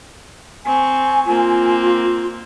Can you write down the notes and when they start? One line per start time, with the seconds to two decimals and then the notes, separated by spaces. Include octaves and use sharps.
0.65 C4 G#5 C#6
1.26 A#3 C4 F4